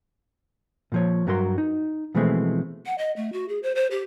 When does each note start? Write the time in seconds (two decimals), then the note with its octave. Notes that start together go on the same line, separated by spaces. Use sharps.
0.92 A#2 F3 C#5
1.27 G2 F#3 F#4 A#4 C6
1.58 D#4
2.15 B2 E3 F3 G#3 A3 C4
2.86 F#5
2.98 D#5
3.17 A3
3.33 F#4
3.49 G#4
3.63 C5
3.75 C5
3.91 G4